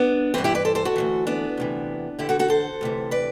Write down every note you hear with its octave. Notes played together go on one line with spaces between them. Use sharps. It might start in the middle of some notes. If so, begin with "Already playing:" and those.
Already playing: B3 D4
G2 E3 C4 E4
E4 G4
B4 D5
A4 C5
A4 C5
F#4 A4
D2 C3 E3
B3 D4
D2 C3 E3
E2 D3 E4 G4
F#4 A4
F#4 A4
A4 C5
D2 C3 E3
B4 D5